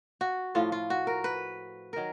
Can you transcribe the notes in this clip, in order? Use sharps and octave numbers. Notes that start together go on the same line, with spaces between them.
F#4
A2 F3 F4
F4
F#4
A#4
B4
D#3 F#3 A#4